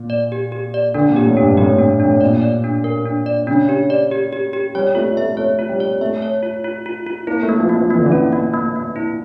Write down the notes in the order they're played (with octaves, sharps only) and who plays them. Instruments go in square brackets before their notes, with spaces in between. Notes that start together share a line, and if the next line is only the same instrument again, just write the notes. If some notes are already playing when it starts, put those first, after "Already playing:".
Already playing: [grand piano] A#2
[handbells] D5
G4
G4
D5
[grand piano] D3 [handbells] D4
[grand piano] A#2
[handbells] G4
[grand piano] A2
[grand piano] G2 [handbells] D4
[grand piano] A2 [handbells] G4
[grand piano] A2
[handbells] D4
D4
[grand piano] A2
[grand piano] A#2 [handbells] D5
[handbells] D5
D4
A#4
D4
D5
[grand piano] C#3 [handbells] D4
[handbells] G4
D5
G4
G4
G4
[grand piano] G3 [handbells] C#5
[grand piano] A3 [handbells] F4
[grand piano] A3 [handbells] E5
[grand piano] A3 [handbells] C#5
[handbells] F4
[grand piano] G3
[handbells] C#5
[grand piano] A3 [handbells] E5
[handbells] C#5
F4
F4
F4
F4
[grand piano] A#3 [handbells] E4
[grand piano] A3
[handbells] A#3
[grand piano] F3
[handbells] A#3
[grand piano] F3
[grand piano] E3 [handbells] A#3
[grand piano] D3
E3
[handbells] C#4
A#3
A#3
A#3
E4